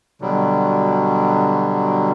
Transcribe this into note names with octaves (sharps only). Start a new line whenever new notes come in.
B2 D3 F#3 G3